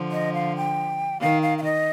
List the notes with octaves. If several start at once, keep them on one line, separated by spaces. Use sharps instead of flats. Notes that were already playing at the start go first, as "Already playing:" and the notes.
Already playing: D3 F3
D#5
F5
G5
D#3 F5
F5
F5
D#5